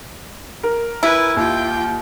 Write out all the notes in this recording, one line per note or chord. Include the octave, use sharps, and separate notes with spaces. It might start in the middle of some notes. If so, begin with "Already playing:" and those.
A#4
E4 B4 G#5
D#2 F4 G5